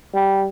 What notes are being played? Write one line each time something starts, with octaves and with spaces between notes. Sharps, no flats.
G3